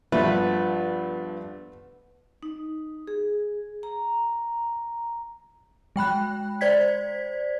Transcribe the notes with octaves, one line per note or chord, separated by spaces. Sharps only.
G2 F3 A3 B3 B4 E5
D#4
G#4
A#5
G#3 G5 B5 F#6
C5 D5 G#6 B6